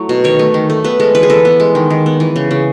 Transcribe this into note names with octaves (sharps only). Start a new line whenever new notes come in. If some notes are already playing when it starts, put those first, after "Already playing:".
Already playing: F#3 A3 E4
B2
D#3 C#5
A3
D#3
A3
B3 B4
G#3 A4
E3 B4
G#4
E3 A4
B3
G#3
D#3
D#3
B3
E3
C#3
C#3